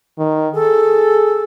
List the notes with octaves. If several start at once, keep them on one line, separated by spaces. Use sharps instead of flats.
D#3
G#4 A4